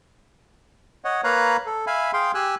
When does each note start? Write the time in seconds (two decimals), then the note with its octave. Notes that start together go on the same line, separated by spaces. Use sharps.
1.05 C#5 D#5 F#5
1.24 A#3 B4 C#5 F5 A#5 F#6
1.66 A4
1.87 E5 F5 G#5 B5
2.13 G#4 F5 G5 C6
2.35 G4 G#5 E6 F#6